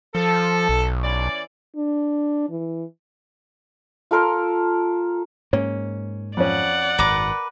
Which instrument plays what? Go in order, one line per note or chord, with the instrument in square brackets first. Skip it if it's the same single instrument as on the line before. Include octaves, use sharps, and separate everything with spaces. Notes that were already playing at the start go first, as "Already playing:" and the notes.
[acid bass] F3 [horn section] A4
[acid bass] B1
[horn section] E3 C#4 D5
[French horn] D4
E3
[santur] F4 A4 A#4 C6
[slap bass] G#2 A#3 [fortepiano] C#4
[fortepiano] F2 C#4 [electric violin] D5 F#5
[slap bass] G#1 F#2 [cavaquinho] A#4 B4 D6